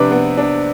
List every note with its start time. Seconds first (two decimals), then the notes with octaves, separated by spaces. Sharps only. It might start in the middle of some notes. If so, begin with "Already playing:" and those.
Already playing: C3 D4 B4 C5 D5
0.11 B3
0.37 D4